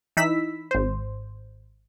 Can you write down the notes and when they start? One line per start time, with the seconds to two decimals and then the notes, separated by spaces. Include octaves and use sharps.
0.17 E3 D#4 B5 E6 B6
0.71 G#1 C5